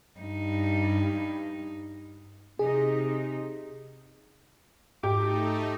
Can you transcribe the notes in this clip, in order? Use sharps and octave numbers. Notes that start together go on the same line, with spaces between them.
G2 D#4
C3 D#4 G#4
G#2 A3 D#4 G4 D6